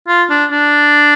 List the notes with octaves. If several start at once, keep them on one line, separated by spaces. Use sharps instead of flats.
F4
D4
D4